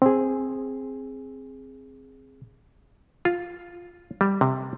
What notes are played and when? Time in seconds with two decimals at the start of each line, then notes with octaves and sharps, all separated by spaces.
0.02 C4 G#4
3.25 F4
4.21 G3
4.41 C3